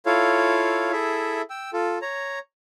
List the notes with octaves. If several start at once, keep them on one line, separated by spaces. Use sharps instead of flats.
E4 F4 A4 C#5 F5
E4 G#4 A4 E5
G5 E6
F4 A4
C#5 A#5